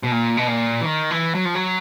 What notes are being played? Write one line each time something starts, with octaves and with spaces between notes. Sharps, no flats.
B2
A#2
B2
A#2
E3
D#3
E3
F#3
F3
F#3